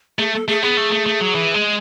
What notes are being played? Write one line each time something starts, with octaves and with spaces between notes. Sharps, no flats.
A3 G#4
A4
A3 G#4
B3 G#4
A3
A3
A3
F#3
E3
G#3